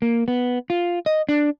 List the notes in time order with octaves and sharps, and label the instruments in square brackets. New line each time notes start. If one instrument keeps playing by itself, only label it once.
[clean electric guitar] A#3
B3
F4
D#5
D4